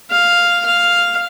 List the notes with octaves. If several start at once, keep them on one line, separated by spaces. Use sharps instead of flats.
F5
F5